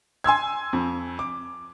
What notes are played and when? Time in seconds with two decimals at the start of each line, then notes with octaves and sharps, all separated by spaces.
0.24 G#5 C6 E6 G#6
0.73 F2
1.19 D6